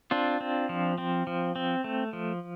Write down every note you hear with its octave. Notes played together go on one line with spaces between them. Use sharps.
C4 D4 F4
C4
F3
C4
F3
C4
A3
F3